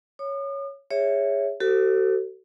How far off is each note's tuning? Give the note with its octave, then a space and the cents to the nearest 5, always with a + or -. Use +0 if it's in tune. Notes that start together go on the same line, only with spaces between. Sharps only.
C#5 +0 D#6 -45
G#4 -25 C#5 +0 E5 +0
F#4 +45 A4 +25 C5 +0